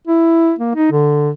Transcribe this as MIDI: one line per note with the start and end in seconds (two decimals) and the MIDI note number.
0.07 0.53 64
0.59 0.74 58
0.75 0.90 63
0.92 1.30 50